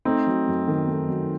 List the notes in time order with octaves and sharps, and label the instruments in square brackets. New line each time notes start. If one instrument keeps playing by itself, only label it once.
[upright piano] A3 [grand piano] C4 D#4
[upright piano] F#3
F#2
D#3
A3
F#3